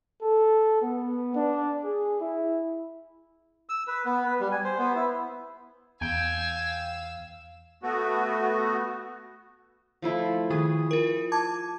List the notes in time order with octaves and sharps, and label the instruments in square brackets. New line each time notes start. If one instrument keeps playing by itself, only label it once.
[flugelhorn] A4
B3
D4
G#4
E4
[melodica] E6
B4
B3
B4
G3
G#5
C5
B3
E4
[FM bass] E2 [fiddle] F5 E6 [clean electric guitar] G5 [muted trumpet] G#5
[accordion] A3 B3 F#4
[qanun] F3 A3 E4
[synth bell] D#3 [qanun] G#4 B4
[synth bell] F4 A#4
A5 D6 G#6